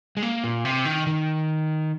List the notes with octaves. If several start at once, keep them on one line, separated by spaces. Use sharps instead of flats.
G#3
A#3
A#2
C3
D#3
D#3